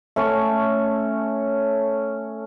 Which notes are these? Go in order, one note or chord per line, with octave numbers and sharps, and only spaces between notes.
A3 C#4 C#5